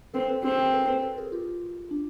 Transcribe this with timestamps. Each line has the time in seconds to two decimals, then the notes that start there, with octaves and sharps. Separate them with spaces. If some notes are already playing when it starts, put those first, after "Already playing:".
0.14 C4 A4 B4
0.28 A4 B4
0.43 C4 F#4 G#4
0.58 G#4 A#4
0.74 A4 B4
0.88 A4 B4
1.02 A4 B4
1.18 G#4 A#4
1.32 F4 G4
1.91 D4